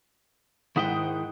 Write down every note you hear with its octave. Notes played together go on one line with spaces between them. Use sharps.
G#2 D#3 E4 F#5 G5 D#6